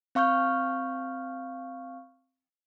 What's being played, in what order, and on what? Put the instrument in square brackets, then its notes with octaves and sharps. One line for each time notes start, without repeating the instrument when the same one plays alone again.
[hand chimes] C4 F5 C#6 F6 G6